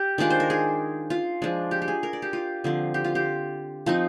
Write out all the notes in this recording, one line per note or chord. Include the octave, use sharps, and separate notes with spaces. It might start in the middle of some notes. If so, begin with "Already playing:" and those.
Already playing: G4
D#3 G#3 D4 F4 D5
C5
A#4
G#4
F4
F3 G#3 D4
G4
G4
G#4
A#4
D5
G4
F4
D3 F3 C4
G4
F4
G4
F3 C4 D#4